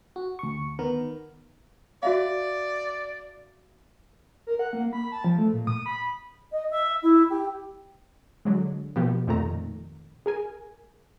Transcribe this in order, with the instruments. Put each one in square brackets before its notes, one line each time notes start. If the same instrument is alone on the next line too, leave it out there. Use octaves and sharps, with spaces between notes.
[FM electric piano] F#4
D2 C#6
D#3 B3 A#4
[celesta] F#4 E5 F5 [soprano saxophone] D5
[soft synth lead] A#4
F#5
A#3
B5
A5
F3
A3
A#2
D#6
B5
[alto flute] D#5
E5
E4
G4
[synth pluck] D3 F#3 G#3
B2 F3 A#3 G4
F2 A#2 D#3 A3 A#5
G#4 A#4 G#5